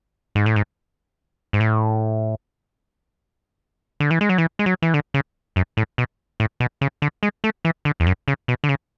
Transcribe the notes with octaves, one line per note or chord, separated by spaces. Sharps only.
G#2
A2
G#2
G#2
A2
D3
E3
G#3
F#3
E3
G#3
F#3
E3
D3
C#3
F#2
A2
B2
A2
B2
C#3
D3
G#3
A3
E3
D3
E2
F#2
C#3
B2
D3
C#3